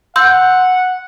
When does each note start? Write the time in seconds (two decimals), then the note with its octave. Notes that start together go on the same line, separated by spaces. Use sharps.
0.16 F#5 C6 E6 G6